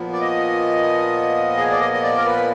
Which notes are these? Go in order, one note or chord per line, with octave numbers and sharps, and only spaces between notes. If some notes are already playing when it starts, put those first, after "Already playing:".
Already playing: A#2 F3 B3
D5
D#5
G#4
D5
D#5
D#5
D5
A#4
B4